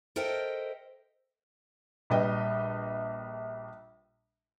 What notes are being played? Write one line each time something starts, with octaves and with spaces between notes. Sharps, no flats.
A4 A#4 C5 D#5 E5 G5
A#1 G3 B4 D#5 G5